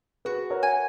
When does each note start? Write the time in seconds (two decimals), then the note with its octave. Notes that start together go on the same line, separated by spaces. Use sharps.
0.25 F#4 G#4 B4
0.50 A#4 C#5
0.63 G#5